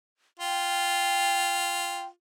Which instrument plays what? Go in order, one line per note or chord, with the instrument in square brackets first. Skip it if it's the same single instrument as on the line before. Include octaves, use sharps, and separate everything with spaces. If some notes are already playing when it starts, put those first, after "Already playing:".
[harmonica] F4 [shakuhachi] G5